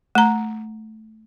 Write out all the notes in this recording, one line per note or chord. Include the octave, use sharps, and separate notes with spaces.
A3 A#5